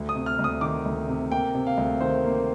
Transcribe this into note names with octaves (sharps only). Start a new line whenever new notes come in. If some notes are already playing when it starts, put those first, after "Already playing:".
Already playing: D2
D#6
C3
F6
D2
D#6
D#3 D6
D2
C3
A#3 G5
C3
F5
D2
D#3 C5
A#3